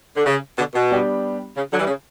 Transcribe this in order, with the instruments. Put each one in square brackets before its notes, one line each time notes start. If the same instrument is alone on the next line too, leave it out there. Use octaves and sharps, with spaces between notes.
[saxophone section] D3
C#3
B2 D3
B2
[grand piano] G3 B3 D4 G4
[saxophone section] C#3
D3 F#3
E3 G3
C#3